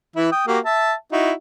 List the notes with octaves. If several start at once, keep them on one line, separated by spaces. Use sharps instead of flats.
E3 E4
G5 D#6
A#3 F#4 G4
E5 A5
D#4 E4 F#4